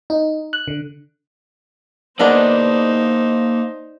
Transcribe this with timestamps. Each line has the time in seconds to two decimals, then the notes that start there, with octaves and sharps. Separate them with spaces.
0.10 D#4
0.53 F#6
0.68 D3
2.19 D#3 A#3 B3 D4 D#4 G#4 C5 D5